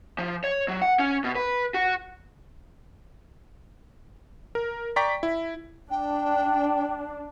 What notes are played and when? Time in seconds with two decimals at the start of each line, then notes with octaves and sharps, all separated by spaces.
0.18 F3
0.44 C#5
0.68 F#3
0.82 F#5
0.99 C#4
1.24 B2
1.35 B4
1.74 F#4
4.55 A#4
4.96 D5 G5 A#5 C#6 B6
5.23 E4
5.91 D4 G5